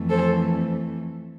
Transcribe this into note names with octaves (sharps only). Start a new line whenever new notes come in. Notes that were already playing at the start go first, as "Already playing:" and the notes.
Already playing: F2 E3 A3
A4 C5